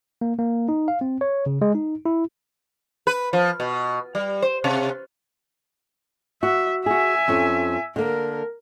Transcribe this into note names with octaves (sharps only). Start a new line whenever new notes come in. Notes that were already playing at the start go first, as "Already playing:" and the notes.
A#3
A#3
D#4
F5
C4
C#5
C#3
G#3
D#4
E4
B4
F3
B2
G3
C5
C3
F#4 E5
F#4 G#4 E5 G#5
F2 C#4
D3 A#3 A#4